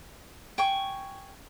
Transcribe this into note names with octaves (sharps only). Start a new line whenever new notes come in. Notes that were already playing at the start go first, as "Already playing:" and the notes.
G5 G#5 C#6